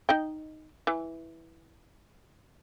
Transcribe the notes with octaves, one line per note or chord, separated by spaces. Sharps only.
D#4 D#5 G5
E3